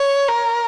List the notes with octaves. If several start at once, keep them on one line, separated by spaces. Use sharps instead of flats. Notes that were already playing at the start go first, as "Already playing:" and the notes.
Already playing: C#5
A#4